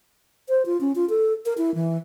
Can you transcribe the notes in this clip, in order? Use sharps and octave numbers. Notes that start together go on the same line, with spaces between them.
C5
F4
C#4
F4
A4
A#4
E4
E3